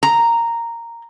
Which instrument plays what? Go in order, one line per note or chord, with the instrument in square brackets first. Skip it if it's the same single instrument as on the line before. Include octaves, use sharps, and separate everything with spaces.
[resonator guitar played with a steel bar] A#5